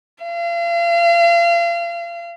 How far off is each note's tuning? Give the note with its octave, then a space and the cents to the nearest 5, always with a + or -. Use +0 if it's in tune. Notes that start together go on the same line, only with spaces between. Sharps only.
F5 -35